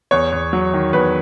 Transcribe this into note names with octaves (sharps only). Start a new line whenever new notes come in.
E2 C#5
E2
F#3
D#3
E2 B4